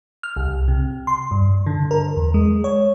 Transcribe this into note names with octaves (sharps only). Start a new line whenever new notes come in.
F6
C2
C3
C6
G2
D3
A#4
E2
G#3
C#5